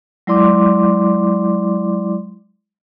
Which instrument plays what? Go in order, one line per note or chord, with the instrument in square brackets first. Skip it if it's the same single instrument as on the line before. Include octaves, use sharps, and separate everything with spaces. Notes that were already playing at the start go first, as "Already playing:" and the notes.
[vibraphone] F#3 G#3 E4 D5 C6 D6